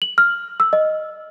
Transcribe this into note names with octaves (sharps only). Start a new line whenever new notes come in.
F#7
F6
E6
D#5